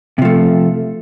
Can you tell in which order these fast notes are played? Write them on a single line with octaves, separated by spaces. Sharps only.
C3 F3 A3